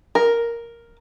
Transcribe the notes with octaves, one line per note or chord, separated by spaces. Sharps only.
A#4